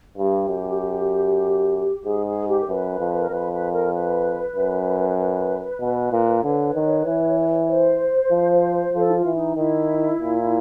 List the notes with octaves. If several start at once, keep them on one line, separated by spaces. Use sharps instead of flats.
G2 G4
F#2
G#2 G#4
G#4
G4
A#4
F#2 B4
F2
A#4
F2 B4
B4
A#4
B4
F#2
B4
B2
A#2
D3 B4 C#5
D#3
E3
C5
F3
F3 A4
E4
F4
E3
D#4
D#3 E4
A#2